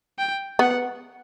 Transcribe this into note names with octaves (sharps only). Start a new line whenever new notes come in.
G5
B3 F#5